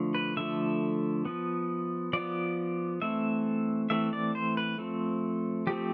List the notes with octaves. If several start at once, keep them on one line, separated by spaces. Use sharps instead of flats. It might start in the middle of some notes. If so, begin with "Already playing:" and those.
Already playing: D3 F3 A3
B4
D3 F3 A3 E5
F3 B3
F3 B3 D5
E3 A3 C4 E5
E3 A3 C4 E5
D5
C5
B4
F3 A3 C4
F3 A3 C4 G4